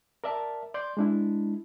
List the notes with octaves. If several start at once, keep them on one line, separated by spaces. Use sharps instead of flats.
A#4 D5 E5 A5
D5 C6 G6
G#3 D4 E4